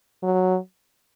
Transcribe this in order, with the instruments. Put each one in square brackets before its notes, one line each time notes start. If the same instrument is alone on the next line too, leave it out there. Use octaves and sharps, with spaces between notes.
[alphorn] F#3